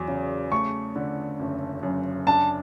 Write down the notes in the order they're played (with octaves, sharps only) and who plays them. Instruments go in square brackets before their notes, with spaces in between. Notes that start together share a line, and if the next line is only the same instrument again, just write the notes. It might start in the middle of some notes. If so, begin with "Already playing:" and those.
Already playing: [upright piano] E2 F#3
C#3
[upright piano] A3 [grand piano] C#6
[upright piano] D3
F#1
F#2
[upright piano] D4 [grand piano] A5